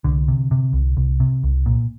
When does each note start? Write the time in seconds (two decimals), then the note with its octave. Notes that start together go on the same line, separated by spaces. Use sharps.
0.04 C2 D3
0.28 C3
0.51 C3
0.73 C2
0.97 C2
1.20 C3
1.44 C2
1.66 A#2